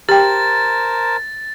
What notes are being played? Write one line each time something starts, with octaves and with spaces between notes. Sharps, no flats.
G4 A#4 C5 G5 A5 A6